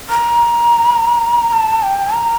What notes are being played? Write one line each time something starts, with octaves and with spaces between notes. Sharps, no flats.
A#5
A5
G5
A#5